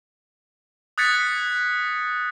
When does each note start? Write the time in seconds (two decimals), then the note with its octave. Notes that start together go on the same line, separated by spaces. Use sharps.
0.98 D#6 F#6 G#6 A6 B6 C#7